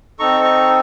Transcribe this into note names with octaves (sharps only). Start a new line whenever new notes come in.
C4 D#4 A4 A#5 C#6
A#5 C#6